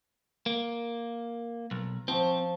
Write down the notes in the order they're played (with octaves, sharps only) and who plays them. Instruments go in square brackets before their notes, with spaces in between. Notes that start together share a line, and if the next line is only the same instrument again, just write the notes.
[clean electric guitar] A#3
[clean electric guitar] B1 [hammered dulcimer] A#5
[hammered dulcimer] F3 C#6 [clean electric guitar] C4